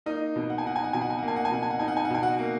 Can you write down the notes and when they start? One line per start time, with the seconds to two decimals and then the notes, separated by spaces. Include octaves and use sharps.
0.06 A#3 D#4 D#5
0.36 B2
0.50 F#5
0.58 G#5
0.65 D#4 F#5
0.76 G#5
0.84 F#5
0.93 B2 G#5
1.01 F#5
1.10 G#5
1.19 F#5
1.23 A#3
1.28 G#5
1.36 F#5
1.45 G#5
1.51 B2 F#5
1.63 G#5
1.71 F#5
1.79 D#4 G#5
1.88 F#5
1.97 G#5
2.05 F#5
2.10 B2 G#5
2.23 F#4 F#5
2.39 A#3